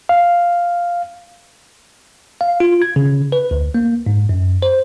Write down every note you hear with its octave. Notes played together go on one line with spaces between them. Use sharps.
F5
F5
F4
G#6
C#3
B4
D2
A#3
G#2
F#2
C5